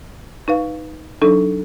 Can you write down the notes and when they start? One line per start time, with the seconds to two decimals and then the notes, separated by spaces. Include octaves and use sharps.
0.48 D#4 B4 F5
1.22 F#3 D4 D#4 A4